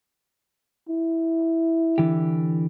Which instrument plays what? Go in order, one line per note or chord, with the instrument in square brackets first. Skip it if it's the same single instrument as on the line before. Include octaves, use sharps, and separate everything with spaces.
[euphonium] E4
[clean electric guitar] D3 E3 G4